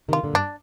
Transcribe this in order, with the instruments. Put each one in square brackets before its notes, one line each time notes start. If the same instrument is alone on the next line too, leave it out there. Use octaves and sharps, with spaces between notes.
[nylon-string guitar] C3 D#3 [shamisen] F4
[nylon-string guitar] A#2 D3
[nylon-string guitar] G2 [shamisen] D4